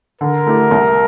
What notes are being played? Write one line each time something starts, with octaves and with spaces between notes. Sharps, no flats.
D3 A#4
A3 E4 G4
C2